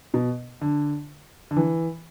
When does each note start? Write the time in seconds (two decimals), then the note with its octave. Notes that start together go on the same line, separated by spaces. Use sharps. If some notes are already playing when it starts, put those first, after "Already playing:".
0.14 B2
0.61 D3
1.51 D3
1.57 E3